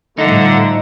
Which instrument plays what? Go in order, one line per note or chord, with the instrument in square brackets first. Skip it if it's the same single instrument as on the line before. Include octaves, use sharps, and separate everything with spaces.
[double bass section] A2 F3 G3 [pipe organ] D3 F#5 [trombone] A3 [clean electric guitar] D#4